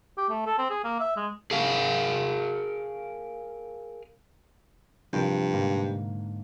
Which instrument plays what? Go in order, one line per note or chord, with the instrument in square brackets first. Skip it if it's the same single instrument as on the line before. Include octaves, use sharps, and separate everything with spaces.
[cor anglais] G4
A3
A4
C4
G#4
A#3
E5
G#3
[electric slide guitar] G#4 A#4 F5
[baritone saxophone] G2 [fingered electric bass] C3 F#3 C#4 [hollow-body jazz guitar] F3 A#4
[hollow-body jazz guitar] G#2 D3 A#3